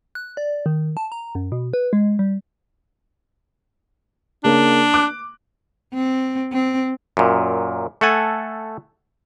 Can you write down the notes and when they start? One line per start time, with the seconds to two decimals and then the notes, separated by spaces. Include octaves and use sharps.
0.15 F#6
0.37 D5
0.66 D#3
0.97 A5
1.12 A#5
1.35 F#2
1.52 B2
1.74 B4
1.93 G#3
2.19 G3
4.44 C#3 A#3 D4
4.94 D6 F#6
5.94 C4
6.53 C4
7.17 F#2 A#2
8.01 A3 A4 F#5 G#5